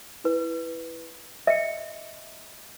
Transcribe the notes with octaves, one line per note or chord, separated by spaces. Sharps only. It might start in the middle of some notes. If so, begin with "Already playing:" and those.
E4 B4
D#5 E5 C#7